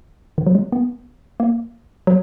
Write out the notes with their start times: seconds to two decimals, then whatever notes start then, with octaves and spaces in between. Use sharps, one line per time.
0.38 D#3
0.47 F#3
0.55 G#3
0.72 B3
1.40 A#3
2.07 F#3